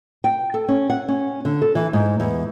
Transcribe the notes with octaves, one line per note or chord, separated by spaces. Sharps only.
G5
A4
C#4
F#5
C#4
D3
A4
E3
G#2
E2